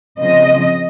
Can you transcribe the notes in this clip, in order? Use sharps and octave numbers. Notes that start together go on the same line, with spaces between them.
C#3 F3 C4 D#5